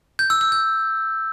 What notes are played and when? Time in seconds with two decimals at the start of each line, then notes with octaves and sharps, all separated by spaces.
0.19 G6
0.30 E6
0.41 E6
0.52 G6